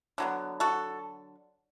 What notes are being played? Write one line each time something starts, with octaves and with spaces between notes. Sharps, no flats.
D3 F#3 B3
F#4 A4